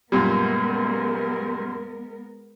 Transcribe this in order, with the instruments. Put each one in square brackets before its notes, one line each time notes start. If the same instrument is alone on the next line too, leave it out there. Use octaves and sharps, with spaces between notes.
[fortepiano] F#2 A#2 G3 [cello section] G#3 B3 A#4